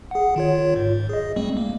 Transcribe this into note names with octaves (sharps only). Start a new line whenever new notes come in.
G#4 F#5
D#3 F4 C#5
G#2
G#4 D#5
G3 A3 C4
A#3